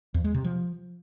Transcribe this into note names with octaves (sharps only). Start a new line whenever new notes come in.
E2
G#3
C3
F3